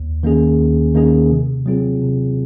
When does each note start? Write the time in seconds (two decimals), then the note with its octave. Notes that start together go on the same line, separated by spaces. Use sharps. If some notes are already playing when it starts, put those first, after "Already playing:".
Already playing: D#2
0.23 D#3 A#3 C#4 G#4
0.59 D#2
0.95 D#3 A#3 C#4 G#4
1.31 C3
1.66 F#3 C4 F4 G#4
2.02 C3